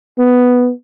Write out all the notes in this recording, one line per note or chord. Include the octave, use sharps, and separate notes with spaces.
B3